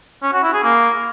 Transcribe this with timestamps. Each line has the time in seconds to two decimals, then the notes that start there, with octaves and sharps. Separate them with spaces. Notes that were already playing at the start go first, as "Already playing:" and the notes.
0.23 C#4
0.33 F#4
0.43 E4
0.54 G#4
0.64 A#3